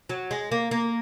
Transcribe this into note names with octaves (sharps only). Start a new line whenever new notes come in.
F#3
G#3
A#3
A#3